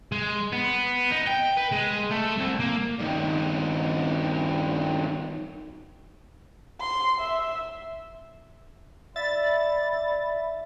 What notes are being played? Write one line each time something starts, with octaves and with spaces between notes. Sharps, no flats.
G#3
B3
D#4
G5
B4
G#3
A3
C2
A#3
G2 D#3
C6
E5
E4 D5 E5 A6